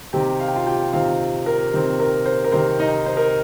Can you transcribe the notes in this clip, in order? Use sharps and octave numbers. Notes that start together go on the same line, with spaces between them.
C3 D#3 C4 G4 G5
F5
G5
F4 F5
G4 G5
C3 D#3 C4 F4 F5
A#4
C3 D#3 C4
A#4
C5
A#4
C3 D#3 C4 C5
D#4 D#5
C5
A#4